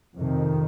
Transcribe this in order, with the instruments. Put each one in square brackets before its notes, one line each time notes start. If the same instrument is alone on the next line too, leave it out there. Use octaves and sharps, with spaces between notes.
[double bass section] F2 C3 D#3